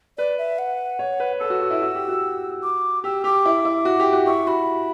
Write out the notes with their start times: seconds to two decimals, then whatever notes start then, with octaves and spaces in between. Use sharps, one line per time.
0.18 B4 D5
0.38 E5
0.59 F#5
0.99 C#5
1.20 B4
1.40 A4 E6
1.50 F#4
1.61 F#4
1.71 E4
1.82 F#4
1.95 G4
2.08 F#4
2.63 D6
3.04 G4 E6
3.24 G4 D6
3.46 E4
3.65 E4
3.85 F#4
4.00 G4
4.13 F#4
4.26 E4 C#6
4.47 F#4 B5